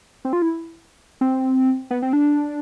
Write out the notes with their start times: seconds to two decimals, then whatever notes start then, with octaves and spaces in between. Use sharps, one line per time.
0.25 C4
0.33 F4
0.42 E4
1.21 C4
1.91 B3
2.02 C4
2.13 D4